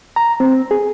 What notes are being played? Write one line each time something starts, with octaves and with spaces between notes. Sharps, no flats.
A#5
C4
G#4